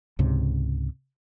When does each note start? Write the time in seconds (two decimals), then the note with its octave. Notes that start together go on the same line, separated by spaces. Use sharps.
0.19 C#2 G#2 C3